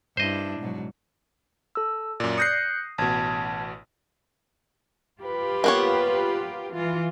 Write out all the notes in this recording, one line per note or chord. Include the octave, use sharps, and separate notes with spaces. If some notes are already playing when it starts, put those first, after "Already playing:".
G2 D4 E4 C5 D#5
G#2 B2 F#3
A4 E6
F#2 A#2 D5
D#6 F#6 G6 A#6 C7 C#7
A1 B2 A5 G#6
F4 G4 B4
A#3 B3 C#5
E3 F4